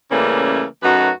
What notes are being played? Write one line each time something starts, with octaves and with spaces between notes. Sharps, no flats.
C#3 E3 G3 A3 A#3 C#4
F#2 A3 D#4 F#4 B4